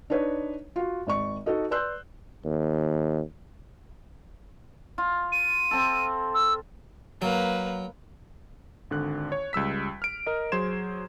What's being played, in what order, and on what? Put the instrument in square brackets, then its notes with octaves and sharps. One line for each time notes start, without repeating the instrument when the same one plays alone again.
[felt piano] D4 D#4 B4 C#5
F4 F#4
G#1 D5 C#6
D#4 F#4 A4 D#5
B4 D5 C6 E6 F#6 G6
[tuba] D#2
[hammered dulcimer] F4
[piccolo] D#7
[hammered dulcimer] C4 A4
[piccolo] E6
[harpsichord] F#3 [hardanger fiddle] A#3 B4
[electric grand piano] G#1 D3 F#6
C#5
C#2 G3 E6 B6
F6 D7
A#4 D#5
F#3 G#4 C5 C6 G#6 E7